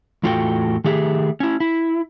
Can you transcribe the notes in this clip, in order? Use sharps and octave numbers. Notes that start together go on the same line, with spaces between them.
E2 A2 F4 F#4 A4 G5
D#3 A3 G4 G#4 E5
C#4 E4
E4